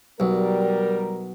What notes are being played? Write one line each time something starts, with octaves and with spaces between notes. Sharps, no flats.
B1 G3 A#4